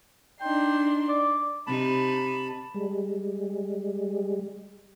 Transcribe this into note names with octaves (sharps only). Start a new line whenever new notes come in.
D4 D#4 G5 C6
D5
C3 D#4 A5 B5
G3 G#3